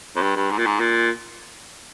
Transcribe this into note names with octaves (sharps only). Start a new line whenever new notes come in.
F2
G2
G2
G#2
A#2
G#2
A#2